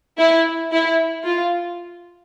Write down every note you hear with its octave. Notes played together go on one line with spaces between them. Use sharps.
E4
E4
F4